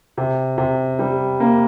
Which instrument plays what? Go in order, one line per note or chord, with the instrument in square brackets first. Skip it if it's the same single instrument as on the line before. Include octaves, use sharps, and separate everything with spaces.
[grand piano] C3
C3
G3
A#3